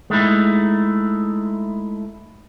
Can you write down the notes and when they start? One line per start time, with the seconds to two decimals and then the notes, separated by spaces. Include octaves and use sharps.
0.10 G#3 A3 D#4 E4